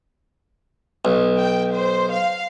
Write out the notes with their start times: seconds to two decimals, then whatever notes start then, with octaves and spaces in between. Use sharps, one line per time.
1.05 B1
1.37 G5
1.72 C5
2.11 F5